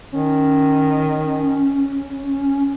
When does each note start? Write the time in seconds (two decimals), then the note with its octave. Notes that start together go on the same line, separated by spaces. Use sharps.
0.12 D#3 C#4